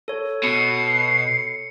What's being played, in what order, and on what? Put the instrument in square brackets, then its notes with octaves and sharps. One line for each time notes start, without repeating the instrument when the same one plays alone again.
[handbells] A4 C#5
[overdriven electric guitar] B2 [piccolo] C7 [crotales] C#7